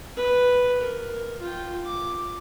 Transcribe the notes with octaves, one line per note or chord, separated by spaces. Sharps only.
B4
A#4
F4 G5
D6